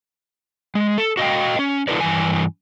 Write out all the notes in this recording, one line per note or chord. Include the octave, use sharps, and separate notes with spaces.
G#3
A4
F#4 D#5 F5 G5
C#4
D#4 F4 A4 B4 D5
G2 E3 G#5